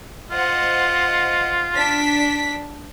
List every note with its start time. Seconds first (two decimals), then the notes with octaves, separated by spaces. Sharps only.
0.31 F4 C5 D#5 F#5
1.75 D4 B6